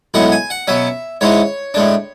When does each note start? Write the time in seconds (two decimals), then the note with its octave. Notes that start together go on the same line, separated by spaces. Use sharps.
0.14 B1 A2 G#3 B3 F#5
0.32 G#5
0.50 F#5
0.67 B2 F#3 C#4 E5
1.21 G#2 E3 G#3 C#4 C#5
1.74 A2 G#3 D4